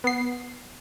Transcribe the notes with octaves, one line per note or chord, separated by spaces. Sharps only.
B3 C7